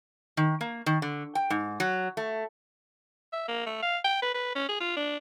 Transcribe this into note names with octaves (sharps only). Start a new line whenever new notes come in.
D#3
A#3
D#3
D3
G5
G#2
F#3
A3
E5
A#3
A3
F5
G5
B4
B4
C#4
G#4
F4
D4